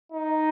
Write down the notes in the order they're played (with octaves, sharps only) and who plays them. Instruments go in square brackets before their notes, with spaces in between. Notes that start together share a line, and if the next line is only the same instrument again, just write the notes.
[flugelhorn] D#4